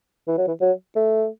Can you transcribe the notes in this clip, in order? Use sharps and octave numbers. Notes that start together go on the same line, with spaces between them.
E3
F#3
E3
F#3
A3